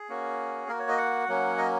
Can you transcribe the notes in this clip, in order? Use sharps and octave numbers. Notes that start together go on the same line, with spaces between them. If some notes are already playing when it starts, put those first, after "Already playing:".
Already playing: G#4
A#3 C#4 F#4
A#3 F#4 A#4
C#5
D#5
F#5
F#3 A#3 C#4
D#5